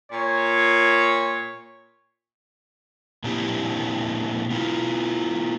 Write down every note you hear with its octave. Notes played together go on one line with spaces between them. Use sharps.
A#2 C#5
A#2 A#3 C4 D4 E4 G4
B3 E4 F4